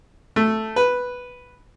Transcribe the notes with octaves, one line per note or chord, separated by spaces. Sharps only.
A3
B4